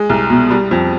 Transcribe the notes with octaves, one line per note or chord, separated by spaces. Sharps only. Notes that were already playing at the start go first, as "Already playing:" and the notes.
Already playing: G#3
C2
B2
G3
F2